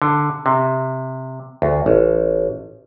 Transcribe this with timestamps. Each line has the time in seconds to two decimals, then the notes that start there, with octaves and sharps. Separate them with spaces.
0.02 D3
0.46 C3
1.62 D2
1.86 A1